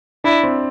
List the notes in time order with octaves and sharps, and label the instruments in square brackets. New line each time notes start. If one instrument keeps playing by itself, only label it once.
[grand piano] D4 [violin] E4
[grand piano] C4